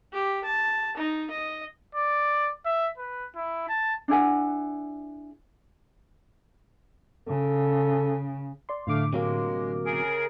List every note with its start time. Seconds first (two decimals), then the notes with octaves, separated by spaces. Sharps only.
0.13 G4
0.44 A5
0.97 D#4
1.30 D#5
1.95 D5
2.66 E5
2.98 B4
3.36 E4
3.69 A5
4.08 D4 E4 G#4 F#5
7.28 C#3 A4
8.69 D5 C6
8.87 A2 D3 A3 F5 D6
9.13 C3 F#3 G#3 A#3
9.85 C#3 G#4 A#4